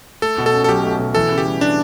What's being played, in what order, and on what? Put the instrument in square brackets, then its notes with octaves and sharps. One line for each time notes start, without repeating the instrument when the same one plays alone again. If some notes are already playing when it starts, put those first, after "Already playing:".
[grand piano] A3 [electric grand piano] A4
[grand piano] B2
[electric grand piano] A4
[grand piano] C#4
[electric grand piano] A4
[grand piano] B1 [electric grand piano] G4
[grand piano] A3
B2
[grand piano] E3 [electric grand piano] A4
[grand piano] C#3
[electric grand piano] G4
[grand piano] G3
[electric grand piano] D4